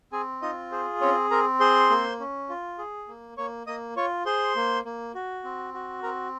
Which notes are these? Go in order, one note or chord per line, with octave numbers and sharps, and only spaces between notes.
C4 G#4 G#5
D#4 F4 D#5
G#4 C5
C4 C#4 C#5
C4 A#4 A#5
G#4 C5 C6
A#3
C#4
F4
G#4
A#3
A#3 C#5 C#6
A#3 D#5 D#6
F4 C#5 C#6
G#4 C5 C6
A#3
A#3
F#4
C4
F#4
C4 A#4 A#5